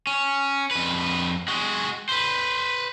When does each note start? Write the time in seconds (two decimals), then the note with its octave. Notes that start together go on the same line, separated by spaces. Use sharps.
0.07 C#4
0.71 F2 B4
1.48 G#3 F#4
2.09 B4 C5